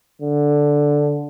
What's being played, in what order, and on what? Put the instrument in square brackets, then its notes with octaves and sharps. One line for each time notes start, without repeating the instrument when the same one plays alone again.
[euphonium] D3